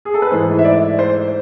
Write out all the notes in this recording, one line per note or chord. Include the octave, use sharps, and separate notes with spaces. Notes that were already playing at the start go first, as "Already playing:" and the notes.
G#4
A4
B4
G#2 E3 A3 C5
E5
D5
C5